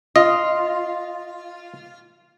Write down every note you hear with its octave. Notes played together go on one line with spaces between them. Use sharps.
F4 D#5